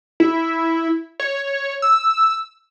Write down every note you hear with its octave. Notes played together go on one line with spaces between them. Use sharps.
E4
C#5
E6